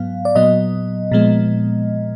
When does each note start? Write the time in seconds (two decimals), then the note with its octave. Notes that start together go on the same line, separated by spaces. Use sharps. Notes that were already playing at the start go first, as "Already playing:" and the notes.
Already playing: G#2 F#3 B3 F5
0.25 D5
0.35 A#2 F#3 B3 D#5
1.11 A#2 F3 G#3 B3